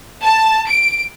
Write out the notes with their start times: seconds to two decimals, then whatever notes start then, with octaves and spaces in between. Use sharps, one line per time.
0.23 A5
0.69 D7